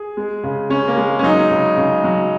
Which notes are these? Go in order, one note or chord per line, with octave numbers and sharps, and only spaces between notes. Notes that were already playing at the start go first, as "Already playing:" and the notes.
Already playing: G#4
G#3
C#3
C#3 C#4
A#3
G#3
C#4
F#3 D#4
C#3
C#3
F#3